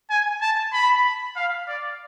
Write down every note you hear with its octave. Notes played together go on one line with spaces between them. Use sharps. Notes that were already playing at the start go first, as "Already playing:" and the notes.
G#5
A5
B5
F5
D5